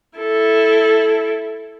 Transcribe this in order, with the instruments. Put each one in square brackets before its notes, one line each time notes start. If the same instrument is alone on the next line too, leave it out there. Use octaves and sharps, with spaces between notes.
[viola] E4 A4